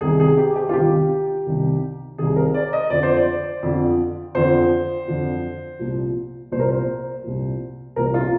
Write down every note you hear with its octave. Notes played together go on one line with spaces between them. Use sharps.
C2 C3 D#3 G#4
G#4
G4
G4
F4
C2 C3 D#3 G4
C2 C3 D#3
C2 C3 D#3 G#4
A#4
D5
D#5
F2 D3 F3 D5
C5
D5
F2 D3 F3
F2 D3 F3 C5
F2 D3 F3
C2 A#2 F3
C2 A#2 F3 C5
A#4
C5
C2 A#2 F3
C2 A#2 F3 A#4
F4